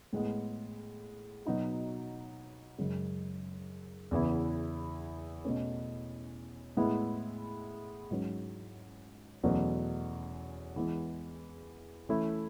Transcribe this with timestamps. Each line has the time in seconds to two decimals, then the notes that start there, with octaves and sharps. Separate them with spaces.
0.13 A2 G#3 B3
1.45 B2 F#3 B3 D#4 F#4
2.78 F#2 C#3 G#3
4.11 E2 C#3 E3 B3 E4
5.45 B2 A3 C#4
6.77 A2 G#3 B3 E4
8.11 G#2 F#3 C#4
9.43 E2 B2 F#3 A3 C#4
10.76 E3 G#3 B3
12.09 E3 A3 C#4 E4